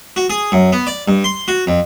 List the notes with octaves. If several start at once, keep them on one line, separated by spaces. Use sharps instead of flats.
F#4
G#4
F#2
B3
D5
G2
C6
F#4
F2